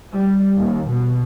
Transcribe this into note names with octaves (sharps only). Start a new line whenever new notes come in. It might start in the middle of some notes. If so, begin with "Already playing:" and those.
G3
D#2
B2